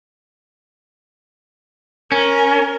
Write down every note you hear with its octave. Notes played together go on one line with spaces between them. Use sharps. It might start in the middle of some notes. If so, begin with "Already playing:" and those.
C#4 A#4